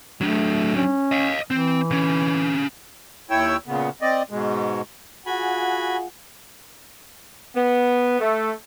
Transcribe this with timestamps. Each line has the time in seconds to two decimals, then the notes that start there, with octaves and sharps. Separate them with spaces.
0.21 F#3 A3 D4
0.76 C#4
1.12 D#5 F5
1.51 E3 C4
1.91 D3 C#4
3.30 D#2 E4 C#5 G5 E6
3.67 A#2 C#3 B3
4.02 C4 D5 D#5
4.30 G#2 B2 G#3
5.26 F4 F#4 G#4 F#5 G#5 B5
7.56 B3
8.20 A3